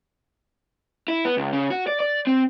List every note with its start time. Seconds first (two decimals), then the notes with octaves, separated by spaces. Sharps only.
1.08 E4
1.25 B3
1.37 C#2
1.53 C#3
1.70 F#4
1.87 D5
2.00 D5
2.27 C4